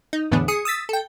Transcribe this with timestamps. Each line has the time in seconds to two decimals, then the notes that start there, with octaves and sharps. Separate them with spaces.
0.13 D#4
0.31 E2 A2 D3 E3 B3 D4
0.48 G#4 D#6 C#7
0.65 D#6 E6 A6 B6
0.89 A4 G5